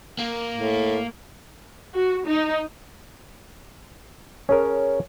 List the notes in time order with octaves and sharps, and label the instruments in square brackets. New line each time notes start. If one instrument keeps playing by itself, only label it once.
[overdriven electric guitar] A#3
[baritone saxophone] A2
[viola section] F#4
D#4
[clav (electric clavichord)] C#4 G#4 A#4 [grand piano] C#5